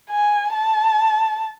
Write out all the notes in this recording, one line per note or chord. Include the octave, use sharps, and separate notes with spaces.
G#5
A5